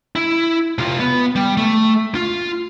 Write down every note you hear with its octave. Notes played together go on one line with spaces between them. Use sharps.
E4
C3 F4
B3
G3
A3
F4